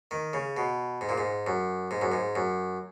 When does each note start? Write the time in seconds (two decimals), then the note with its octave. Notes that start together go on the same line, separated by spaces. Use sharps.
0.11 D#3
0.33 C#3
0.57 B2
1.01 G#2
1.09 A#2
1.18 G#2
1.47 F#2
1.91 G#2
2.01 F#2
2.12 G#2
2.35 F#2